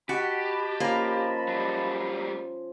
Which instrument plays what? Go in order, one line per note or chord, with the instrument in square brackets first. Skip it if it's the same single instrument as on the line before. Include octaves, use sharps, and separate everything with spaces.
[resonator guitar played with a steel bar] F#4 [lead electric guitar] G4 [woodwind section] D#5 A5 B5
[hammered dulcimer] F3 C#4 [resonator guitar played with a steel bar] A#3
[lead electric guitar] F#3 G3